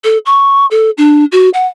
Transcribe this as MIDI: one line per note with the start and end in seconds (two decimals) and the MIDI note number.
0.04 0.18 69
0.26 0.66 85
0.71 0.90 69
0.98 1.25 62
1.32 1.49 66
1.54 1.66 78